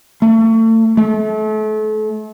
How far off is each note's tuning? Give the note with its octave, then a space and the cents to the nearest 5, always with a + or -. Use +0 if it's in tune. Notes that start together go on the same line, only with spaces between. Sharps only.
A3 +35
A3 -35